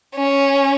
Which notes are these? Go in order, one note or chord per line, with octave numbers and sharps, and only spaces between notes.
C#4